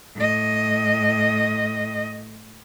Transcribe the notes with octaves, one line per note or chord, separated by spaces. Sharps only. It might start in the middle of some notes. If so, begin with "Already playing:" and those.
A2 D#5